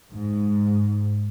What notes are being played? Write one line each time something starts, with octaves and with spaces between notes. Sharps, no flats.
G#2